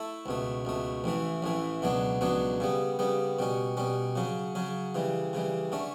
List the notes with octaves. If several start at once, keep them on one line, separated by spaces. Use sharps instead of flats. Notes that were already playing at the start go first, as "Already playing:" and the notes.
Already playing: A3 E4 A4
C#2 B2 A3
C#2 B2 A3
A1 A2 E3 A3
A1 A2 E3 A3
C#2 B2 F#3 B3 D4
C#2 B2 F#3 B3 D4
C#3 G3 B3
C#3 G3 B3
B2 G3 C#4
B2 G3 C#4
C#3 F#3 C#4
C#3 F#3 C#4
C#3 E3 G3
C#3 E3 G3
D3 A3 C#4